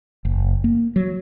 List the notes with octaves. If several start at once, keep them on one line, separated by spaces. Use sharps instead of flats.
F#1
A#3
F#3